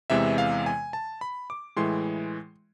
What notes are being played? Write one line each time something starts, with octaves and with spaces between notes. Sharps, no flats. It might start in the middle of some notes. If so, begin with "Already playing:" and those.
E2 C3 E3 G#3 E5
F5
G#5
A5
B5
D6
A2 E3 G#3 C6